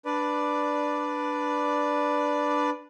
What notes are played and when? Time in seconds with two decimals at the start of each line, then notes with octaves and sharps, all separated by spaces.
0.05 D4 B4 D5